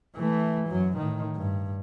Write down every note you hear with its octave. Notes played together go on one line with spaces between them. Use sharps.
E3 A3
F#2 F#3
A2 D#3
G2